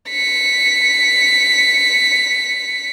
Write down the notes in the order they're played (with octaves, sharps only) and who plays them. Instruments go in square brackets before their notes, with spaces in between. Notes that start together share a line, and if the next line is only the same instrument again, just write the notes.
[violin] B6 C#7